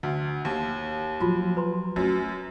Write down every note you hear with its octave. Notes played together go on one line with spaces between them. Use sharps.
D2
D#2
F3 F#3 F4 F#4
B4 A#5 C6
F#2 A3